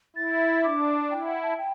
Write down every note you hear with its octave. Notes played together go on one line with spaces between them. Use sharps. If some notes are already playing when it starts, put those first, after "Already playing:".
E4 A6
D4 D6
E4 G5
F#5
A5
G5